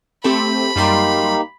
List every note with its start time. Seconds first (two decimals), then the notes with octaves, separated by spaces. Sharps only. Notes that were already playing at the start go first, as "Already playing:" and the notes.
0.24 A3 C4 G4 B5
0.76 F#2 G3 A#3 D#4 G4 C6